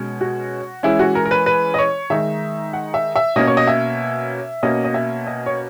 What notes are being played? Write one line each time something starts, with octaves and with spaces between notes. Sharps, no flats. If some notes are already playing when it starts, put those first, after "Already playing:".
Already playing: B2 G#3 C#4
F#4
E3 G#3 C#4 E4
F#4
A#4
A#4
B4
B4
D#5
C#5
D#3 G#3 D#4 E5
F#5
E5
E5
B2 A#3 C#4 D#5
C#5
D#5
E5
B2 A#3 C#4 D#5
D#5
E5
D#5
C#5